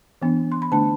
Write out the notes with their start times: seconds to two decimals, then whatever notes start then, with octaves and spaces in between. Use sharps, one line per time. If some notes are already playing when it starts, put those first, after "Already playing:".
0.22 E3 B3 D4
0.52 C6
0.62 B5
0.72 D3 A3 D4 A5